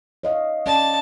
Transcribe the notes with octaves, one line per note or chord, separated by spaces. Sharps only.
C#5 D#5 F5
C#4 D5 A5